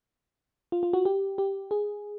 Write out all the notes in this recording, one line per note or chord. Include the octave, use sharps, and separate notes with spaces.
F4
F4
F#4
G4
G4
G#4